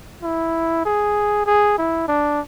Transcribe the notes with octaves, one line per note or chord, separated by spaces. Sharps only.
E4
G#4
G#4
E4
D4